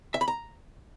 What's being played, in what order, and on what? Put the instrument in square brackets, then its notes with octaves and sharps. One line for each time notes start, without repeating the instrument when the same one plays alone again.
[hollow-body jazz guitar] E5
B5
A#5